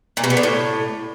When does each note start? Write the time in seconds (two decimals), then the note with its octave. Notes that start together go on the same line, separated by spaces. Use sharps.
0.17 A#2
0.24 B2
0.30 B3
0.37 D3
0.43 A2